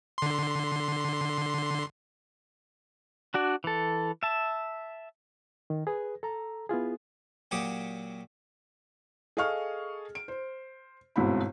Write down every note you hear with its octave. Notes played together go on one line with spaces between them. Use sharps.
D3 C6
D4 F#4 D5
E3 A4
E5 A5
D#3
G#4 B4
A4 A#5
B3 E4 F4 G#4
A#2 F#3 G4 C#5 D6 D#6
G#4 A4 D#5 F5 C#6 F6
D7
C5
G1 G#2 B2 C4 E4 B5